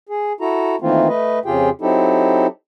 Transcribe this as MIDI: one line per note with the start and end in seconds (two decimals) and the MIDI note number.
0.09 0.33 68
0.41 0.76 64
0.41 0.76 66
0.41 0.76 69
0.41 0.76 82
0.81 1.08 51
0.81 1.08 52
0.81 1.08 57
0.81 1.08 58
0.81 1.08 60
0.81 1.08 65
1.08 1.39 57
1.08 1.39 71
1.08 1.39 75
1.45 1.70 41
1.45 1.70 49
1.45 1.70 65
1.45 1.70 67
1.45 1.70 68
1.45 1.70 79
1.81 2.47 54
1.81 2.47 60
1.81 2.47 63
1.81 2.47 64
1.81 2.47 67
1.81 2.47 69